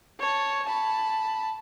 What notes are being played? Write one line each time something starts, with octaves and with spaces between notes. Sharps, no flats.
C#5 A5
A5 B5